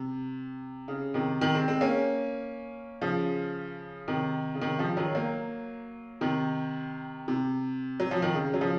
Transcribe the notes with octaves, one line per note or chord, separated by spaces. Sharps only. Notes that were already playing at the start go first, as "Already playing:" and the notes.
Already playing: C3
C#3
C3 D#3
C3 D#3
G#3 C4
G#3 C4
A#3 C#4
C#3 F3
C3 D#3
C#3
C3 D#3
C#3 F3
D#3 F#3
F#3 A#3
C3 D#3
C3
F#3
F3
D#3
C#3
F#3
C#3 F3